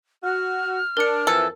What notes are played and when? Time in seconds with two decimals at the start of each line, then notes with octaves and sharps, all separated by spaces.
0.23 F#4 F6
0.97 D4 A#4 C#7
1.27 F2 E3 A4